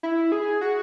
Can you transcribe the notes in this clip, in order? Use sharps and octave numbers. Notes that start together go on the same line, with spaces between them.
E4
G#4
F#4